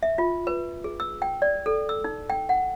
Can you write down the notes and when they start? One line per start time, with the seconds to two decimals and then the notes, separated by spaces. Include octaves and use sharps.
0.03 E5
0.18 F4
0.47 B4
0.84 G#4
1.00 E6
1.22 G5
1.42 D5
1.66 A4
1.89 E6
2.04 D#4
2.30 G5
2.49 F#5